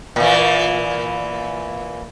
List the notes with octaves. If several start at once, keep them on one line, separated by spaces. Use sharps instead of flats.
A#2 E3